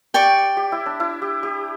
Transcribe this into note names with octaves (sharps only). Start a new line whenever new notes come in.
G4 D5 G5 C#6
G4
E4
D4
E4
G4
G4